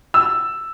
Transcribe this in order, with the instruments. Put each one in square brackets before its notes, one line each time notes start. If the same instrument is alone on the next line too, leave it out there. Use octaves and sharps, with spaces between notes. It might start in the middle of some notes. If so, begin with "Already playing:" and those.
[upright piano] E6